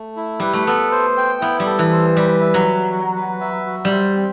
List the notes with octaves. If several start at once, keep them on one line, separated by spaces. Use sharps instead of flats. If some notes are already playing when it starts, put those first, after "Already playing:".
Already playing: A3
E4
G3 B4
A3
B3 A4
C5
G5
B3 E4
G3
A4
E3
C5
G3 B4
E5
F#3
F#4
F#4
B4
E5
F#4
G3
C5
C4